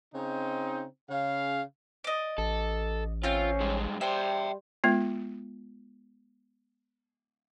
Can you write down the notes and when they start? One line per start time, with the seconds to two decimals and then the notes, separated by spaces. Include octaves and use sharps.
0.15 C#3 C4 D#4
1.10 C#3 F5
2.04 D5 D#5
2.38 A1 A4
3.23 A3 C4 C#4 F4 F5
3.60 G2 G#3
4.01 G3 C5 E5 G5
4.84 G#3 B3 F4